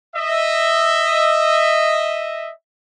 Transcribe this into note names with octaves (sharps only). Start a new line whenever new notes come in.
D#5 E5